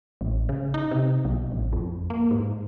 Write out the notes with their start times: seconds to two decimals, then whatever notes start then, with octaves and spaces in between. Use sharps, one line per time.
0.21 A1
0.49 C#3
0.74 D#4
0.91 C3
1.25 B1
1.52 A1
1.73 F2
2.10 A#3
2.31 G#2